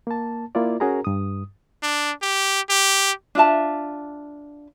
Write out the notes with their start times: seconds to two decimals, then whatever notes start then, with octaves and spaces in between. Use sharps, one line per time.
0.07 A#3 A5
0.55 A#3 E4 F4 D5
0.80 C#4 F#4 G#4 A#4 A#5
1.05 G2 D#6
1.83 D4
2.22 G4
2.70 G4
3.35 D4 F4 E5 A5